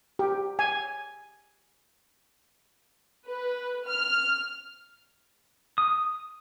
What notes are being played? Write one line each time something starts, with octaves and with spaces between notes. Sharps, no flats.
G4
G#5
B4
F6
D#6